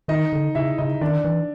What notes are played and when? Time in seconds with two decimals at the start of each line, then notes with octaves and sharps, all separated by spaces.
0.08 D#3 D#4 D#5
0.33 D3
0.55 C#3 E4 E5
0.78 C#3 D#4 D#5
1.01 D#3 D4 D5
1.24 E3